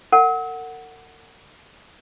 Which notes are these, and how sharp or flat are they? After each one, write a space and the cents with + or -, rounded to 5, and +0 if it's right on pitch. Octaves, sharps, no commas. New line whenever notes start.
A#4 -45 F#5 +0